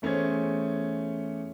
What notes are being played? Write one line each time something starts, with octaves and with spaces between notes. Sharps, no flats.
E2 A3 C#4 G#4 C5 G#6